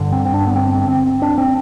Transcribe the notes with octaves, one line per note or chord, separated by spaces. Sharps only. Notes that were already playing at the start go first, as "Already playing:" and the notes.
Already playing: G2 D3
C4
C4
D4
B3
C4
C4
D4
C4